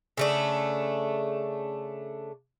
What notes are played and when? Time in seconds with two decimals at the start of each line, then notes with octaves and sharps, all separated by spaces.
0.17 C#3 A3 D4